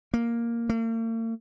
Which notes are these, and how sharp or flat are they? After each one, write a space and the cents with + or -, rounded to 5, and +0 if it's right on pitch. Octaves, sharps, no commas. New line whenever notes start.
A#3 +0
A#3 -45